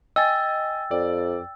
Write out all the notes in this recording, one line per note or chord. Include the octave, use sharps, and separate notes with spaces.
D#5 G5 G#5 E6 A6
F2 D5